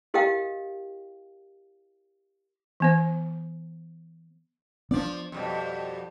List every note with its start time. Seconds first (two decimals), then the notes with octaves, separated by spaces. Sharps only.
0.14 E4 G4 A#4 D#5 F5 G5
2.80 E3 B3 C5
4.91 F3 B3 D4 D5
5.32 F2 B2 G3